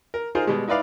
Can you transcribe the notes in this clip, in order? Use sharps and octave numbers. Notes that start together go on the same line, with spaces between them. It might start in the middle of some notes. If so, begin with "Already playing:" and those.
A#4
D#4 F4 G#4 A#4 C5
B2 G3 G#3
D#4 E4 B4 D5 F5